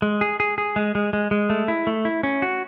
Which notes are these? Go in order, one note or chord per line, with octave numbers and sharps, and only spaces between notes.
G#3
G#4
G#4
G#4
G#3
G#3
G#3
G#3
A3
E4
A3
E4
C#4
F#4